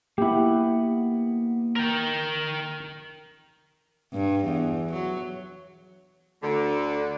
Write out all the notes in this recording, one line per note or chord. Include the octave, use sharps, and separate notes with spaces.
A#3 B3 E4 G4 F#5
A#4 G5
G2
E2
F#3
D2 D3